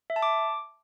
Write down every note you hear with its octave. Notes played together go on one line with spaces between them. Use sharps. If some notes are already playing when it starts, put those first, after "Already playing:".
E5
A5
D6